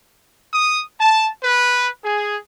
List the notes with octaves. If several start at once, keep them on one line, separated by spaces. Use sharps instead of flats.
D#6
A5
B4
G#4